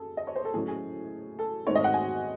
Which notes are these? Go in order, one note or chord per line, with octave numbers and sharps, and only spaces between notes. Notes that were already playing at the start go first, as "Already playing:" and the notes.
Already playing: F#2 G#4 A4
D#5
C#5
C5
A4
A2 F#3 C#4 G#4
G#4
A4
G#2 D#3 A3 C4 D#4 C#5
D#5
F#5
G#5